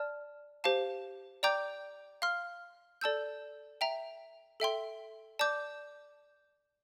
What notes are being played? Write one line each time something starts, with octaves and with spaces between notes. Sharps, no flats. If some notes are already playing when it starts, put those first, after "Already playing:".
Already playing: D5 A5 F6
G4 C5 F5 A5
D5 G5 A#5 D6 G6
F5 C6 F6
A4 D5 A5 E6 G6
E5 G5 A#5
A4 E5 G5 C6
D5 A5 D6 G6